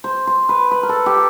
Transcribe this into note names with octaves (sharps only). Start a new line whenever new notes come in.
C5
C5
B4
B4
A#4
A4
G4